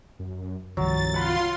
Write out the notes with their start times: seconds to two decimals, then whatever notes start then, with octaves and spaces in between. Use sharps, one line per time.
0.19 F#2
0.77 C2 G2 D#3 F3 F#3 A6
1.14 F4 F#5 B5 C6